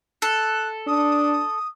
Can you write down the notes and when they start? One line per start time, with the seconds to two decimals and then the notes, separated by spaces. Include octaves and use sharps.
0.22 A4 F#6
0.87 D4 D#6